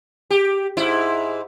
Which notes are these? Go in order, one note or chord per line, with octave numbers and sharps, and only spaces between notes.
G4
G#2 E4